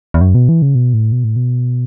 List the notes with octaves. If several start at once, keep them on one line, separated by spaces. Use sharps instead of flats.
E2
F#2
B2
E3
C#3
B2
A2
B2
A2
B2